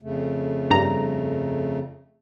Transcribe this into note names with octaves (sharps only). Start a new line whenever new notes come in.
F2 C#3 A3
G2 A#5